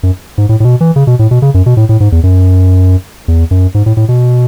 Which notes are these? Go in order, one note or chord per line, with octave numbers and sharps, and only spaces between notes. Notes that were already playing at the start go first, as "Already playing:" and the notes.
F#2
G#2
A2
A2
B2
E3
C#3
B2
A2
B2
C#3
F#2
B2
A2
A2
G#2
E2
F#2
E2
F#2
G#2
A2
A2
B2